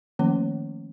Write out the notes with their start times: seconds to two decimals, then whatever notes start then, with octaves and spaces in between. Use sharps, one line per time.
0.19 D#3 F3 A3 A#3 C#4